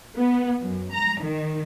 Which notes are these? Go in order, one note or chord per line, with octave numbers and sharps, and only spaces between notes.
B3
F#2
A#5
D#3